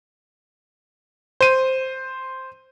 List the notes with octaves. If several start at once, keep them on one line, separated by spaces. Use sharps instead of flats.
C5 D#7